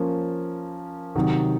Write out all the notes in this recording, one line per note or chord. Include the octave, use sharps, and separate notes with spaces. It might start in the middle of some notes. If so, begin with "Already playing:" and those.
Already playing: F3 A#3 C#4
C3 D#3 F#3